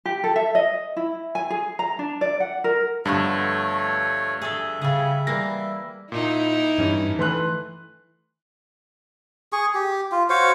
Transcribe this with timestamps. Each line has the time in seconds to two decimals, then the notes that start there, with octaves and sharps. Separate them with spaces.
0.05 G4
0.24 A4
0.36 E5
0.55 D#5
0.96 E4
1.35 G#5
1.50 G#4
1.79 A#5
1.99 D4
2.21 D5
2.40 F#5
2.64 A#4
3.05 G2 D3 F3 A3 B3 C#5
4.42 G#4 A4 E5
4.82 C#3 G3 G#4
5.27 E3 G3 A#3 A#6
6.12 A#2 D#4 E4
6.78 G2 E3 G3 C#4
7.19 E3 A3 B4 C6 F#6
9.53 G#4 C#6
9.75 G4
10.12 F4
10.30 F#4 C5 C#5 F5